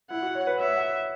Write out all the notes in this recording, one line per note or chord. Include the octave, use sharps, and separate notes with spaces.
E4 F#5
F#4
C#5
B4
C#5 E5
F#5